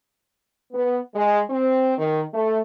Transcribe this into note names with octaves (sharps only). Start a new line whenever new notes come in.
B3
G#3
C4
D#3
A3